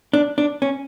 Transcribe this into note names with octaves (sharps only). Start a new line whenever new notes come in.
D4
D4
C#4